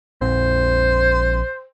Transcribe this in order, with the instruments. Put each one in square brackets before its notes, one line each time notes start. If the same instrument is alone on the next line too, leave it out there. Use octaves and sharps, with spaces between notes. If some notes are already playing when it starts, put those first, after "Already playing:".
[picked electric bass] A#1 C4 [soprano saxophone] C5